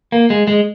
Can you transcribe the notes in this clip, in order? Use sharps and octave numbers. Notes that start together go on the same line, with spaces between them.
A#3
G#3
G#3